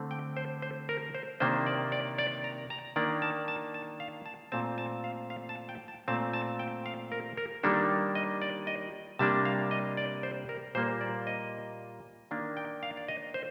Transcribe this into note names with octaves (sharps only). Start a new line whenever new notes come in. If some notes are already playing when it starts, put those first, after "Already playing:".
Already playing: D3 A3 C4
G5
C5
C5
A#4
C5
C3 D#3 A#3 D4 C5
D5
D5
D5
A#5
A#5
D#3 A#3 D4 D5
A5
A5
A5
F5
A5
A#2 A3 C4 A5
A5
F5
F5
A5
G5
A5
A#2 A3 C4 A5
A5
G5
F5
A#4
A#4
D#3 G3 A#3 D4 A4
D#5
D5
D#5
C3 G3 A#3 D4 A5
F5
D#5
D5
C5
A#4
A#2 G3 A#3 C5
D5
D#5
D#3 A#3 D4 F5
G5
F5
D5
D#5
C5